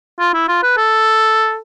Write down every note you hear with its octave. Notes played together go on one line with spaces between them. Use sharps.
F4
E4
F4
B4
A4